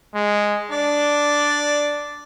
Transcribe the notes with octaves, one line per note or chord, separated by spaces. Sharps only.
G#3
D4 D5